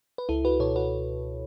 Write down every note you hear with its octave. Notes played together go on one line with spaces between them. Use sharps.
B4
C#2 E4 A4
F#4 B4
B2 A4 C#5
F#4 B4